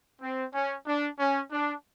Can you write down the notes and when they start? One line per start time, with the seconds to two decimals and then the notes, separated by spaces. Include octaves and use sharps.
0.22 C4
0.54 C#4
0.87 D4
1.19 C#4
1.52 D4